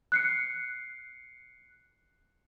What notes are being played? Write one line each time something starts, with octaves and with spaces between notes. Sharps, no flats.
F#6 C7 C#7